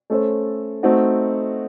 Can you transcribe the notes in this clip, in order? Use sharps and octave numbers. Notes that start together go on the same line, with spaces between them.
A3 C#4 A4 C5
A3 C4 D#4 F#4